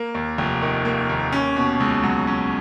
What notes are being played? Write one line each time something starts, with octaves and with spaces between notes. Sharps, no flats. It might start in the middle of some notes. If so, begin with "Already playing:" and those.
Already playing: A#3
D#2
F1
D#3
A#3
D#2
C#4
B2
C#2
F#3
C#4